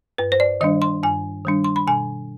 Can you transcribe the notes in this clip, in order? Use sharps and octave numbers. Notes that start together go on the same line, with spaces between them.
G2 B4
C5
D5
D#3 G3 D4 D#5
C6
G2 G#5
D#3 G3 D4
C6
B5
B2 G#5